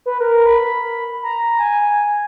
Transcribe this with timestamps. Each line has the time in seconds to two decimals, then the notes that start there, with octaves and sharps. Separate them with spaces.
0.06 B4
0.20 A#4
0.46 B5
1.23 A#5
1.59 G#5